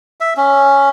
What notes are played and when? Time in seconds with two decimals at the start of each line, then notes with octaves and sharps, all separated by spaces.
0.20 E5
0.37 C#4